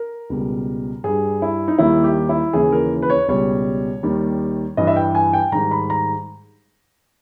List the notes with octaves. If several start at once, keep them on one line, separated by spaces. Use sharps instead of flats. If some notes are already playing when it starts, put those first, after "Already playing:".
Already playing: A#4
C#2 B2 G3
G2 G3 G#4
E4
D#4
D#2 D#3 G3 E4
G4
E4
D#2 C#3 E3 G#4
A#4
B4
C#5
C#2 B2 G3 C#5
D#2 D#3 G3
G2 E3 G3 D#5
E5
G5
G#5
G5
G#2 D#3 G3 A#5
B5
A#5